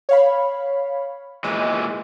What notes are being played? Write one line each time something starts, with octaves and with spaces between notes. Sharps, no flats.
C#5 F5 B5
A#2 E3 G#3 D#5